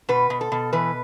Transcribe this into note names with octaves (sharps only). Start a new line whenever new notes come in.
B2 B4
B2
A4
B2
E3 B4